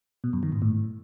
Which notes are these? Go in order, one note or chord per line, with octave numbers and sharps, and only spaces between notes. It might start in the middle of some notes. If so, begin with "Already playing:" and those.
B2
F#2
D#3
G#2
A2